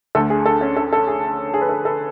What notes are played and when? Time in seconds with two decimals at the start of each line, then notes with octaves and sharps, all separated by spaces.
0.15 D2 D3 A3 A4
0.30 G#4
0.46 A4
0.61 C#4 C#5
0.77 A4
0.93 A4
1.07 G#4
1.54 G#4
1.61 B4
1.69 A4
1.85 A4